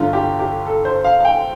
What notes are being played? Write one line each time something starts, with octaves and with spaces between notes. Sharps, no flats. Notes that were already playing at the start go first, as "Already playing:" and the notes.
Already playing: G1 G2 D3 F4
G4
G4
A4
C5
F5
F5
G5